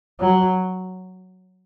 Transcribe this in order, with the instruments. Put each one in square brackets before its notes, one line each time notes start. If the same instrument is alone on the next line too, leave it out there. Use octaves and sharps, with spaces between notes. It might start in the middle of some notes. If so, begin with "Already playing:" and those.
[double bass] F#3